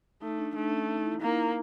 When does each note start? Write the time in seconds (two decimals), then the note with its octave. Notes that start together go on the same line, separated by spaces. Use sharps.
0.22 A3 D#4
0.38 D4
0.55 A3 D4
0.72 C#4
0.89 D#4
1.04 E4
1.21 A#3 D#4